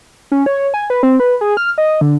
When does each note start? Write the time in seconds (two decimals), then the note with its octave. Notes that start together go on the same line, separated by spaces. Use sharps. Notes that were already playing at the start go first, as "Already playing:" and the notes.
0.32 C#4
0.46 C#5
0.74 G#5
0.90 B4
1.03 C4
1.20 B4
1.41 G#4
1.57 F6
1.78 D#5
2.01 D3